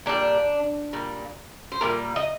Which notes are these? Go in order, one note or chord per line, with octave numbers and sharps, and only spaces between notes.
A#2 G3 D4
A#2 G3
C5
A#2 G3 A#4
D#5